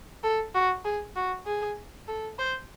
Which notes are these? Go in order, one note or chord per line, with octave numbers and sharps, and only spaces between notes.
A4
F#4
G#4
F#4
G#4
A4
C5